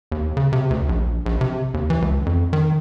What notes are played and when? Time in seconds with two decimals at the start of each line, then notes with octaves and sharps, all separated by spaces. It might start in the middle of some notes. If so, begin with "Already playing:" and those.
0.12 D#2
0.37 C#3
0.53 C3
0.70 D2
0.89 A#1
1.26 A#1
1.41 C3
1.74 D#2
1.90 E3
2.02 C#2
2.26 F2
2.53 D#3